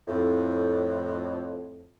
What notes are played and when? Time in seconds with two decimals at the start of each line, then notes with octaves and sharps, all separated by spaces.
0.07 F2 A2